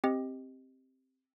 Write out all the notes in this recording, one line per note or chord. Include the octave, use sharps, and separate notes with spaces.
C4 G4 D#5